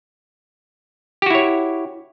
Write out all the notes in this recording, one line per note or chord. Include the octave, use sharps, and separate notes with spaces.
E4 F#4 G4 C#5